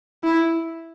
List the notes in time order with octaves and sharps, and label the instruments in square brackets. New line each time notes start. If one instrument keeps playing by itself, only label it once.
[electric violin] E4